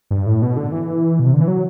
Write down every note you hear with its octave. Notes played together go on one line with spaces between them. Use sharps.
G2
A2
B2
D3
E3
B2
C3
D3
E3
F#3